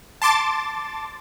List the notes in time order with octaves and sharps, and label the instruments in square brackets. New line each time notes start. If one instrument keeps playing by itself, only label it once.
[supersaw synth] A5 C6 D6 A6